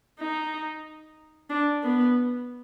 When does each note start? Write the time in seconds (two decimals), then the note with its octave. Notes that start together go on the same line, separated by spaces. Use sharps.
0.19 D#4
1.50 D4
1.84 B3